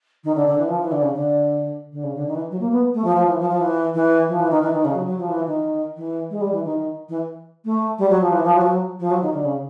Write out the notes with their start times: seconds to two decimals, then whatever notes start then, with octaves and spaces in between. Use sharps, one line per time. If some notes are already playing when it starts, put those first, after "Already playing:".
0.23 D#3
0.35 D3
0.46 D3
0.58 E3
0.68 F3
0.80 E3
0.91 D3
1.01 C#3
1.13 D3
1.92 D3
2.03 C#3
2.14 D3
2.26 D#3
2.34 E3
2.50 F#3
2.60 A#3
2.71 B3
2.93 A3
3.04 F3
3.15 F3
3.27 E3
3.38 F3
3.49 F3
3.60 E3
3.94 E3
4.28 F3
4.39 E3
4.50 D#3
4.61 E3
4.73 D#3
4.84 C#3
4.94 F#3
5.06 F#3
5.18 F3
5.28 E3
5.46 D#3
5.96 E3
6.30 G#3
6.40 G3
6.52 E3
6.64 D#3
7.08 E3
7.64 A3
7.98 G3
8.09 F#3
8.21 F3
8.31 E3
8.43 F3
8.55 F#3
8.61 F3
8.65 F#3
8.99 F3
9.10 F#3
9.21 D#3
9.33 D3
9.44 C#3